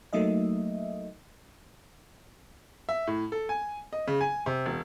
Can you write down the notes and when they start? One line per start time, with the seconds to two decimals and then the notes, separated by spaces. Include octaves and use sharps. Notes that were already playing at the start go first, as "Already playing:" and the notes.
0.13 F#3 A3 A#3 D#4 D#5 E5
2.89 E5
3.07 A2
3.32 A4
3.49 G#5
3.93 D#5
4.07 C#3
4.21 G#5
4.46 C3
4.66 E1